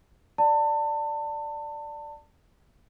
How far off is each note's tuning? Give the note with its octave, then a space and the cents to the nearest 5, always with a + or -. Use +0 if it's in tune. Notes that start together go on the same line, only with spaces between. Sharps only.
D5 +0 A5 +30